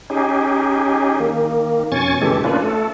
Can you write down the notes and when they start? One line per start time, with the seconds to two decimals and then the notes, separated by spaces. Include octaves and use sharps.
0.10 C#4 D#4 G4 G#4
1.20 D#3 A#3
1.92 F2 B2 C#4 G#5 C#6 A6
2.21 A2 C#3 E3 G#3 G4 A4
2.44 A#3 C#4 D4 F4 B4
2.63 A3 A4